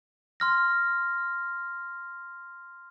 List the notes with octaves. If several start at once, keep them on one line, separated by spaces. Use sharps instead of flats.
C6 F6 A#6